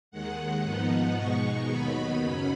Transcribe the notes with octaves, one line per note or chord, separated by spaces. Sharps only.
D#2 D#3 G#3 F#5
G#2 F3 B3 D#4 F#5
B2 G#3 D#4 C#6
D#2 D#3 F#3 B3 D#4 B5
F#2 C#3 F#3 C#4 B5